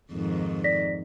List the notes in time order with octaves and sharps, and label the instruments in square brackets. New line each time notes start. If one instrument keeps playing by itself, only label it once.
[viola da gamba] F2 G#2 D#3
[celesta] D5 A#6 B6